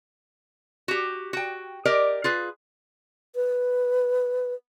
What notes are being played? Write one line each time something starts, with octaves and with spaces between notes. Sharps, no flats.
F#4 G4
F#4 G5
G4 A#4 D5 D#5
F4 G#4 B4
B4